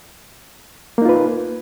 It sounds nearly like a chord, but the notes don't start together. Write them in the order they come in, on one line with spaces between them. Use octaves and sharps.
A#3 D#4 F4 B4